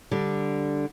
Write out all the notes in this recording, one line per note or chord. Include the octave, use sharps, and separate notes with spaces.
D3 G3